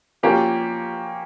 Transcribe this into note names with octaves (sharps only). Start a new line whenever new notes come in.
F3 A#3 C#4 G4